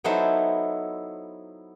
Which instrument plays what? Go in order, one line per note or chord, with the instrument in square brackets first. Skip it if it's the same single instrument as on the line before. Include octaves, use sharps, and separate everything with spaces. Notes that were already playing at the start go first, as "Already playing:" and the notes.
[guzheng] F#3 B3 D#4 E4 A4 C5